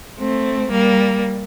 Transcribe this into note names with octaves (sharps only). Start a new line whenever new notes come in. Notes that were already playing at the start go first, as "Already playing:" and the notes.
A3 C4
G3 A#3